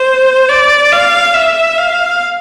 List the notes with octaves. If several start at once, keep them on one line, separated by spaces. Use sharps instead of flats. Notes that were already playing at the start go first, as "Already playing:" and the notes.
Already playing: C5
D5
F5
E5
F5